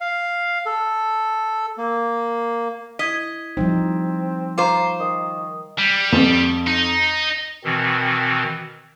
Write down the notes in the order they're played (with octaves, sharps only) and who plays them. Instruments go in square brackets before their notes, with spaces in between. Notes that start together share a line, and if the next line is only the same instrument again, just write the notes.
[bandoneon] F5
A4
A#3
[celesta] E4 G#6 B6 [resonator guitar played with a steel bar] D#5
[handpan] F3 G3 D#4 [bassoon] C4
[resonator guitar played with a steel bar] F4 C5 [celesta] A#5 C#6 D6
[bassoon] D#3 [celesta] D#6
[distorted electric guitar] G3
[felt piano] F2
[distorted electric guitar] D#4
[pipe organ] B2 D#3 E3 C4